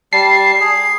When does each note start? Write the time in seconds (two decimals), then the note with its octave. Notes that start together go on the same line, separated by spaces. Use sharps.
0.13 G3 A5 C7
0.61 G#4